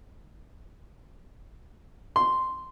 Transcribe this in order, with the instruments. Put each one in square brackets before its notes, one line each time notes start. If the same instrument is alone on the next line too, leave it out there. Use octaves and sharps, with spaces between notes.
[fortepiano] C6